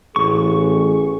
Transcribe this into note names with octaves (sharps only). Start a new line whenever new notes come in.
A1 G#4 C#6